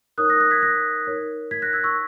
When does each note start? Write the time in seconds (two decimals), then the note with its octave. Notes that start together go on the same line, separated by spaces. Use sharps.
0.18 D#4 A#4 C#5 D#6 F#6
0.29 F#6 A#6
0.40 F#6 A#6
0.51 G#6 B6
0.63 F#6 A#6
1.07 D#4 A#4 C#5
1.51 G#6 B6
1.62 F#6 A#6
1.73 E6 G#6
1.84 C#6 E6